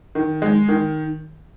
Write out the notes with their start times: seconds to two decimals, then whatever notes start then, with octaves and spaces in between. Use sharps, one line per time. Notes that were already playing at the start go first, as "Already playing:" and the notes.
0.15 D#3
0.42 G#3
0.69 D#3